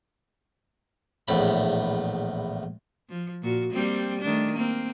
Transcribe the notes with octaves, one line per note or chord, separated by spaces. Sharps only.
A#1 E2 A2 B5
F3
A#2 F#4
G3 A#3 C4
D#3 A3 D4
A#3 C4